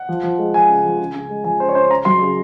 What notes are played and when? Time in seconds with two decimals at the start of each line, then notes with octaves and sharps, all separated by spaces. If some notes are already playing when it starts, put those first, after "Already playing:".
Already playing: F#5
0.09 F3
0.23 F3
0.38 G#3
0.53 F3 G#5
0.69 C#3
0.84 F3
0.99 C#3
1.15 C#3
1.30 G#3
1.44 F3 G#5
1.60 C#3 C5
1.69 C#5
1.75 C#3 C5
1.91 C#3 A#5
2.05 F#3 C6
2.21 C#3